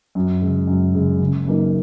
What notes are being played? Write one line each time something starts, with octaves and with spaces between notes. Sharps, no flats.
F#2
C#3 G#3
F#2
C#3 G#3
F#1
F#2 E3 A#3 D#4